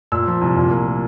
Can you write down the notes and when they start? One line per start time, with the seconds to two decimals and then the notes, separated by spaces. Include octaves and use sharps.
0.12 A#2 E6
0.27 F3
0.42 C2
0.56 A#2
0.71 A#3
0.87 A#3